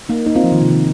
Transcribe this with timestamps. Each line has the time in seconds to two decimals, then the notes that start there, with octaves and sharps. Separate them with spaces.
0.09 A#3 D#4
0.26 A#3 D#4
0.36 C4 F4
0.44 F3
0.52 D#3
0.61 C3
0.70 D#3